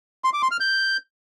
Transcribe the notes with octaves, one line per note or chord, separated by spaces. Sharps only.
C6
D6
C6
F6
G6